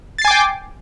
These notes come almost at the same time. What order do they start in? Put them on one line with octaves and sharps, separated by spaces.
A6 C7 G#5 D6 G5